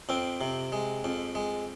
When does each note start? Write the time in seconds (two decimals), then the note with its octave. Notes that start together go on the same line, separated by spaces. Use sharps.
0.09 F2 C4
0.41 C3
0.72 G#3
1.04 F2
1.35 G#3